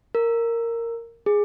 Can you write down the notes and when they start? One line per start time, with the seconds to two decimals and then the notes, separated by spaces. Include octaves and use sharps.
0.15 A#4
1.26 G#4